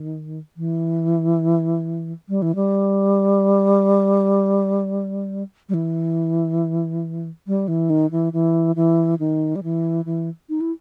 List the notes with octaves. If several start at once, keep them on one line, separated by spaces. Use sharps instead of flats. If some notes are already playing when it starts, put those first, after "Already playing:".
Already playing: D#3
E3
G3
E3
G3
G3
E3
G3
E3
D#3
E3
E3
E3
D#3
G3
E3
E3
D#4
E4